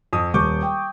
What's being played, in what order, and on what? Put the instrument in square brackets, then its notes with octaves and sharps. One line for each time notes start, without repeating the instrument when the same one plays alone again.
[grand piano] F2 D#6
[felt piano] D#1 [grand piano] C#6 D6 G6
[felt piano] G5